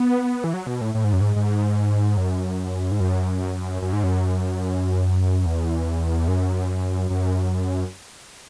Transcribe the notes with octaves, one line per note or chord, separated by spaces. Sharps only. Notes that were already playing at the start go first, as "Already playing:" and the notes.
Already playing: B3
E3
F#3
B2
A2
A2
G#2
F#2
G#2
G#2
F#2
G#2
F#2
F#2
G#2
F#2
E2
F#2
F#2